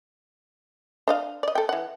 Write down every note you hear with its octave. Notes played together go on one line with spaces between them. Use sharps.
D4 D#5 F5
D5 D#5
A4 G5
E3 F#5